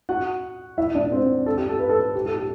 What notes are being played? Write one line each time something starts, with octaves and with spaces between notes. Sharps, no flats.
F#4 F#5
E4 E5
D4 D5
C4 C5
A4
G4
A4
B4
A4
G4
A4
G4